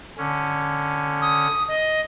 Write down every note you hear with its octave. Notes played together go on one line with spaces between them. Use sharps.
D3 C#4
D#6
D#5